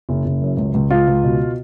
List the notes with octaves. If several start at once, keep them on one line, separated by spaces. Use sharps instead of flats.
F#1
F#1
F#2
C#2
C#2
C#2 F4
C#2
B2